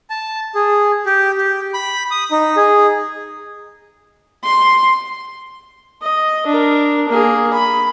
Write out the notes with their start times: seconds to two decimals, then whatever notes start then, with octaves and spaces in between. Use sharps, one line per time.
0.10 A5
0.55 G#4
1.06 G4
1.38 G4
1.74 B5
2.11 D#6
2.31 D#4
2.57 G#4
4.44 C6
6.03 D#5
6.47 D4 A#4
7.09 A#3 G#4
7.53 B5